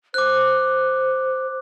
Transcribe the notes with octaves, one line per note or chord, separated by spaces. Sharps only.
C5 D6 F#6